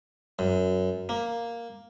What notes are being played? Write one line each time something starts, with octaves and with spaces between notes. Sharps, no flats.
F#2
A#3